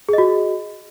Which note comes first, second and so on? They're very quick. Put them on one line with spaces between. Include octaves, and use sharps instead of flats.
G#4 D#5 F#4